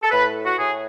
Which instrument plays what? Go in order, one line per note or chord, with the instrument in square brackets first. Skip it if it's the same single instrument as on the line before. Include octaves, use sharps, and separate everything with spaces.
[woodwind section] A4
A2 B4
F#4
A2 G#4